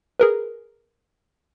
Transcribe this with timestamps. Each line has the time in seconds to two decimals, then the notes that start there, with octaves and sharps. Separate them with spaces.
0.20 G#4 A#4 B4